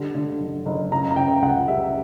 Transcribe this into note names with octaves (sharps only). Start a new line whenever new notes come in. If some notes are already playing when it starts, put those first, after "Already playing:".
Already playing: D3 G3
D3
F#1
F#1
C#3 A#5
A#5
C#3 G5
C#2 F#5
G3 E5